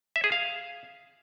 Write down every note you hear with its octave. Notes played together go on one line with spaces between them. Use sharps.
E5
G#4
F5